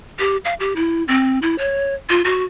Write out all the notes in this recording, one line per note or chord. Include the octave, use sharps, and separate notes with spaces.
G4
F5
G4
E4
C4
E4
C#5
F4
F#4